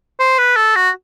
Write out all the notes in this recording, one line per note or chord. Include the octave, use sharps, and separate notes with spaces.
C5
B4
A4
F#4